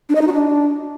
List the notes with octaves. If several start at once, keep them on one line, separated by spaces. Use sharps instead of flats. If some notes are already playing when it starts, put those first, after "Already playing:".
D4
D#5
D#4
F#4
D4